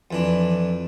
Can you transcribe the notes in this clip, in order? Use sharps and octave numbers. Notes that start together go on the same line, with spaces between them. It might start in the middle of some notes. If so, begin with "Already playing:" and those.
F2 E3 D4